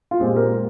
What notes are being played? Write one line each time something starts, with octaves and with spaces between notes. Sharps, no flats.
F4
A#2 G#3 C4 G4
A#4